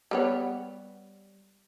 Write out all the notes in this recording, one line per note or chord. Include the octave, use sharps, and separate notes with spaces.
G3 B3 C#5